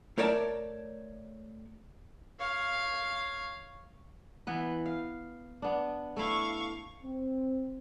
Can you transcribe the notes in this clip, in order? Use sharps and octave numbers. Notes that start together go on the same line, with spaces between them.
A3 A#4 C#5 D5 G5 A5
C#5 F5
E3 B3 B4
F5
B3 D4
A3 E4 F5 C#6
C4